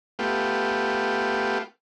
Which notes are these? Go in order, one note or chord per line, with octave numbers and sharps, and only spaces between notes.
A3 B3 F4 G4